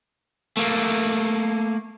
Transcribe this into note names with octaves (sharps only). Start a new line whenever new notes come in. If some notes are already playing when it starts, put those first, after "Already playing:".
A3 A#3